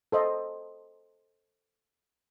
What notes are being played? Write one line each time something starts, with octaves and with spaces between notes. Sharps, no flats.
A4 C5 D#5